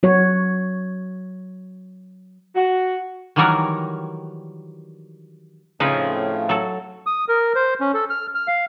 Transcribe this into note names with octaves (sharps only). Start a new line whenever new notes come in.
F#3 F#4 C#5
F#4
D#3 E3 F#3 G3 F#4 A#4
A2 C#3 F3 C4 D#4 G#4 B4
F#3 A4
D#6
A#4
C5
C#4
A4
F6
F6
F5